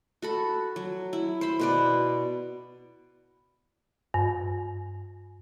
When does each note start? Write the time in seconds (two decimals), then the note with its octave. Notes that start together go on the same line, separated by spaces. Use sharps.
0.22 F#4 A4 B5
0.76 F#3
1.13 E4
1.41 C5 B5
1.59 B2 B4 D5
4.14 G2